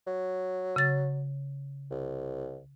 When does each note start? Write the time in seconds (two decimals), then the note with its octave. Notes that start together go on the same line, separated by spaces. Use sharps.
0.07 F#3
0.76 C#3 A6
1.91 C2